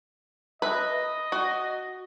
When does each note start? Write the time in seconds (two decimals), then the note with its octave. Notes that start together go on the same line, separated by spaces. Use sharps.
0.62 B4 D#5 E5
1.32 F#4